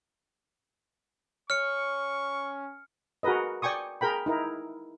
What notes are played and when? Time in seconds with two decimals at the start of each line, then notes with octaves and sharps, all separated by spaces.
1.50 C#4 C#6 F6 C#7
3.23 F#4 G#4 A#4 B4 D#5
3.62 D5 G5 G#5 C#6 D#6
4.01 G#4 A#4 G5 B5
4.26 D#4 E4 A#4